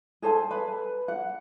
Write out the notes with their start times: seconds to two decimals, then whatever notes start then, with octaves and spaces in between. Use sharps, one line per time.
0.22 G#4 A4 C5 G#5
0.51 B4 B5
1.08 F#5